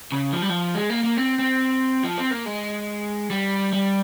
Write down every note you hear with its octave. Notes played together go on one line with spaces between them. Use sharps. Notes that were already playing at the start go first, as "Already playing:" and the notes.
C#3
F3
G3
F3
G#3
A#3
A#3
C4
C4
F3
C4
A#3
G#3
G3
G3